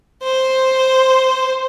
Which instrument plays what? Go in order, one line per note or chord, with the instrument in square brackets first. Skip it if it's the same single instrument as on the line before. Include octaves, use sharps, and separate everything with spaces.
[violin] C5